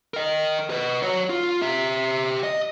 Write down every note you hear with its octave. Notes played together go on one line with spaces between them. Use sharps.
A#4 D#5
B4 D#5
F#4 C#5
F4
G4 E5
D#5